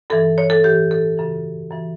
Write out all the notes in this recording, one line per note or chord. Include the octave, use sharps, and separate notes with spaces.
G2 E3 A4
C#5
A4
A2 E3 G4
A4
F#2 C#3 E3
F#2 E3